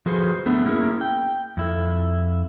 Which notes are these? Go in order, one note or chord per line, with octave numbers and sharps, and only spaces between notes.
F3 F#4 G#4 A4 B4 C5
A3 B3 D4
A#3 C#4 E4 G#4 A#4
G5
F2 E4 A4